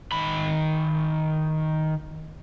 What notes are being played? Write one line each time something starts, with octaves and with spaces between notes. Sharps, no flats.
D#3 B5